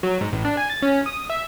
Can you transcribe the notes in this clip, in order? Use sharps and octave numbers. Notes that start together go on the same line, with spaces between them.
F#3
G#2
A1
D4
G#5
A6
C#4
D#6
E5